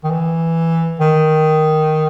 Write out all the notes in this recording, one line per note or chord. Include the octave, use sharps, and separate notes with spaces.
D#3
E3
D#3